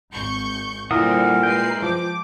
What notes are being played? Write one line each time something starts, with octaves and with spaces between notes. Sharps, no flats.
G#1 C#6 G6
A#2 D3 G3 C4 E4 A#4 F#5 D#6
G#3 B4 G5 C7
F3 D6